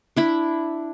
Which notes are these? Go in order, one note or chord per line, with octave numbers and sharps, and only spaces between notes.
D4 E4 B5